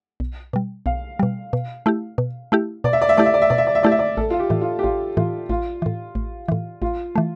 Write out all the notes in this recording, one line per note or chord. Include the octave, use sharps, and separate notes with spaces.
B1
B2 G3
B1 F5
B2 G3
B2
A3 E4 G4
B2
A3 E4 G4
B2 D5
E5
D5
E5
A3 E4 G4 D5
E5
D5
E5
B2 D5
E5
D5
E5
A3 E4 G4 D5
E5
D5
A1 A4
F4
G4
A2 E3
F4
G4
A1 F4
A2 E3 F4
A1 F4
A2 E3
A1
A2 E3
A1 F4
E3 A3